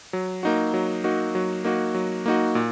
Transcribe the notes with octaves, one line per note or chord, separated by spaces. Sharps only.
F#3
A#3 D#4 F#4
F#3
A#3 D#4 F#4
F#3
A#3 D#4 F#4
F#3
A#3 D#4 F#4
A#2